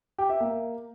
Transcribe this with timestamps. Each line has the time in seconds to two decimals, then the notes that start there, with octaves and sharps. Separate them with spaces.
0.18 G4
0.29 E5
0.40 A#3